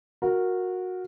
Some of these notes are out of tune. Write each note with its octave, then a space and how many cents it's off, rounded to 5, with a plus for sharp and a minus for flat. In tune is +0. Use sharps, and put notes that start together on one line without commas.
F#4 -15 A#4 -5